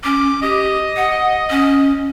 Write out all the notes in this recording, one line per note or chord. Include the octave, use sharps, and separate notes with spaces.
C#4 D6
G4 D#5
F#5
C#4